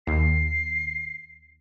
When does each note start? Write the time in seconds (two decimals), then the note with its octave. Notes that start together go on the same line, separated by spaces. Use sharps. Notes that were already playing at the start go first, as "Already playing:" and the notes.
0.07 D#2 C7